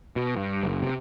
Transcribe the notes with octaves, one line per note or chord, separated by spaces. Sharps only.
B2
G2
F#1
C3